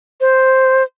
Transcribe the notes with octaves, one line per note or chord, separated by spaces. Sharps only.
C5